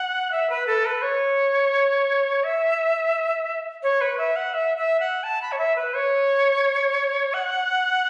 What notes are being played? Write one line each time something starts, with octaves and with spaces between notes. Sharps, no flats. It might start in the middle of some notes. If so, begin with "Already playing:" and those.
Already playing: F#5
E5
B4
A4
B4
C#5
E5
C#5
B4
E5
F#5
E5
E5
F#5
A5
B5
C#5
E5
B4
C#5
F#5